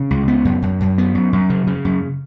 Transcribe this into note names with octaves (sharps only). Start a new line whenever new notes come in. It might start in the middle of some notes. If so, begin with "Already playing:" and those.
Already playing: C#3
C#2
B3
F#2
F#2
F#2
B3
F#2
F#2
C#3
C#3
F#2